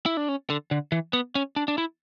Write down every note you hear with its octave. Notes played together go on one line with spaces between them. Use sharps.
E4
D4
C#4
D3
D3
E3
B3
C#4
D4
D4
E4